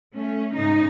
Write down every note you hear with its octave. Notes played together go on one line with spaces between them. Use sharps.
A3 C#4
G#2 C#3 D#4